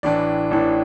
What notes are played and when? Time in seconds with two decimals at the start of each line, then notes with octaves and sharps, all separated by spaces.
0.03 A1 A2 E3 D4 D5
0.51 A1 A2 E3 D4